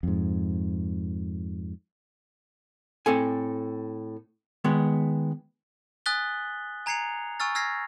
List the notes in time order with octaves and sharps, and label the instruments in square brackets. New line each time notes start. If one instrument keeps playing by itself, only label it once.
[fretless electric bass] F2 G#2
[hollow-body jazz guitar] A2 C4 A4 G#5
D#3 G#3 B3
[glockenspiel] G#5 D#6 F#6 A6 B6 G7
G#5 A#5 G#6 C7 C#7 F7
G#5 C#6 E6 F6 A6
E6 F6 G#6 A#6 C7